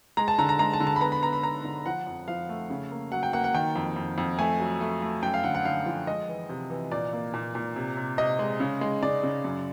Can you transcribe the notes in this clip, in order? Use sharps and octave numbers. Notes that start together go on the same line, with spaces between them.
G#3 A#5
A5
D3 A#5
A#5
G#3 A#5
A5
D3
A5
B5
B3 A#5
B5
B3 A#5
B5
B3 A#5
D3
F3 F#5
F2
F3 F5
A3
C#3
A#3
F#3 F#5
G5
A#3 F#5
F#5
D#3 G5
F2
F2
F2
A3 G#5
F#3
A3
A3
F#2 G5
F5
D3 F#5
F#5
D3 F5
F3
G#3 D#5
E3
C3
E3
A#2 D5
A#3
A#2
A#2
C3
C3
C3 D#5
G#3
C#3
G#3
C#3 D5
C#3
F#2